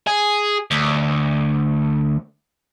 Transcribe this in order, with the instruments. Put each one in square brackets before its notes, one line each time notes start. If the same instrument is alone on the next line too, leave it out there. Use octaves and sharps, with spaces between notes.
[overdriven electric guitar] G#4
D2